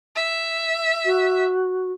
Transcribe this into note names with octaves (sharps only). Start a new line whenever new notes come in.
E5
F#4